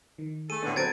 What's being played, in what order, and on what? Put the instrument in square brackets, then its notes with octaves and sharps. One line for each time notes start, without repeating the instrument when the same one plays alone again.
[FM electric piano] D#3
[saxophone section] A3 A4 [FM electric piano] G#4 [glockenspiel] D#7
[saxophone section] A2 D3 [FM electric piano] B3 C#5 A6
[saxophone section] F#3 C4 [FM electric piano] A4 B4 A5 [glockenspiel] G#6 A6 D7